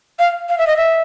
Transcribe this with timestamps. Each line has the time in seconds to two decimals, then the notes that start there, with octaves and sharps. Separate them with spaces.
0.19 F5
0.49 F5
0.58 E5
0.67 D#5
0.77 E5